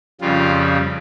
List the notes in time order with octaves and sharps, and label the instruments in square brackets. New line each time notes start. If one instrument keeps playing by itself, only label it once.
[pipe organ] F2 C#3 G3 F4